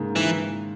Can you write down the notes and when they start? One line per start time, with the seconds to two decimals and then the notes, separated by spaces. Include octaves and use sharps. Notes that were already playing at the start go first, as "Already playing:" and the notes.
Already playing: G#2 C#3 A#3
0.16 D#3 E3